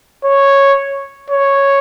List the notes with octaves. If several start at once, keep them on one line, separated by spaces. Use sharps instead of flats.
C#5
C#5